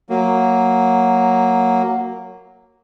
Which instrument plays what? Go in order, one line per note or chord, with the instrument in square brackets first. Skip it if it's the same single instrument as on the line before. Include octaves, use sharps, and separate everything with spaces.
[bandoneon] F#3 A#3